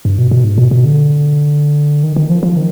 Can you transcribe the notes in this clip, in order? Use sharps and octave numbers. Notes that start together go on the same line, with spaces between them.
G2
B2
B2
G#2
B2
B2
D3
D#3
D#3
F3
F3
D#3